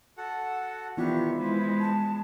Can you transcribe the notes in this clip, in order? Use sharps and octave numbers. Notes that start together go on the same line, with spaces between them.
F#4 A4 F#5
D#3 E3 B3 D4 E4 F4 G4 C#6
G#3 B4 C5
A5